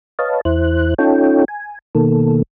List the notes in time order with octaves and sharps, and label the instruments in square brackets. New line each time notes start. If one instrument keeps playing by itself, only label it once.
[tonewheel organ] B4 C#5 D#5 F5 A5
E2 E4 C5 F#6
C#4 D#4 F4 A4 C#5 G5
G#5
B2 D#3 A#3 A4